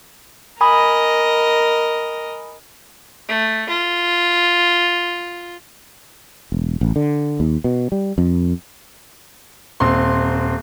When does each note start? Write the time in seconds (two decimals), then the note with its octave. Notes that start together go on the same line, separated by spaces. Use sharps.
0.61 A#4 D#5 G#5 B5 D#6
3.28 A3
3.69 F4
6.52 E1
6.81 A1
6.96 D3
7.40 D#2
7.64 B2
7.92 G3
8.18 F2
9.80 D#1 C4 C6